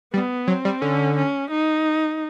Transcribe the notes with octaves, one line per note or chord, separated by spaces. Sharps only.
G3 B3
F#3 C4
G3
D3 C#4
C#4
D#4